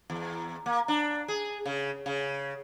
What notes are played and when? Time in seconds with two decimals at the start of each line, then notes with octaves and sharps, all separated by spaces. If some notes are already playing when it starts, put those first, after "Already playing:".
0.10 E2
0.66 A#3
0.88 D4
1.28 G#4
1.66 C#3
2.06 C#3